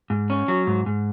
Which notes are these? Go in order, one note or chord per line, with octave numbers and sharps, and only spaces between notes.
G#2
C#4
F#3
G#2
G#2